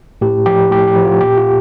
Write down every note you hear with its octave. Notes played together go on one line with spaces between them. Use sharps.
A2 G4
F3 G4
A2 G4
G4
F3
F4
A#2 G4
F4